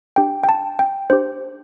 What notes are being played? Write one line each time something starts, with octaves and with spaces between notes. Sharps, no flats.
D4 G4 G5
G5
A5
G5
D4 G4 C5